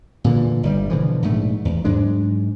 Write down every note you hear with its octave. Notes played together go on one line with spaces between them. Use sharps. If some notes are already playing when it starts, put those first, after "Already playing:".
A#2 D3 E3
G1 C#3 G3
B2 D3 E3 F3
A#1 G#2 A3
E2
G#2 F#3 G#3 D4